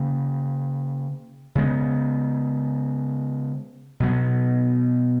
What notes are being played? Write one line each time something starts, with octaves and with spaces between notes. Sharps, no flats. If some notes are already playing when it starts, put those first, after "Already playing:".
Already playing: C#3 A#3 C#4
C#3 G#3 B3
B2 F#3 B3